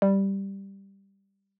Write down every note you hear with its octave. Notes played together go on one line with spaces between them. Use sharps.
G3